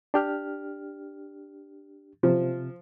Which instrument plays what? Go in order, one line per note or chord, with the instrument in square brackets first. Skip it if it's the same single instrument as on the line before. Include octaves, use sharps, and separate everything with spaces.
[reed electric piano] D4 G4 F6
[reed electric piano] C3 [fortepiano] F3